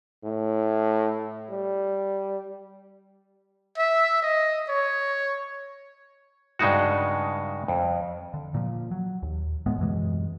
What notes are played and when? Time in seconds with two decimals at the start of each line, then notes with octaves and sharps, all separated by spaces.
0.24 A2
1.50 G3
3.78 E5
4.23 D#5
4.69 C#5
6.59 G2 C#3 G#3 D#4 F#4
7.68 F2
8.34 D3
8.54 A#2 F3
8.91 F#3
9.23 D#2
9.66 D2 A2 G#3 B3
9.78 F#2 B2 E3 G#3